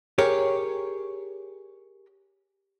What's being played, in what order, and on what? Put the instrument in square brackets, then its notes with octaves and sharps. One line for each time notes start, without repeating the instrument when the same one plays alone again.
[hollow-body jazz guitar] G4 G#4 A#4 C#5